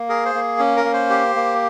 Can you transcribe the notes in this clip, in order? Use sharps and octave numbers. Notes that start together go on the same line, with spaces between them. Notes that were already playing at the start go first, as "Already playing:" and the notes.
Already playing: A#3
G#4 A#4
C5
A#3
C#4
A#4
A#3
C5
G4
A#3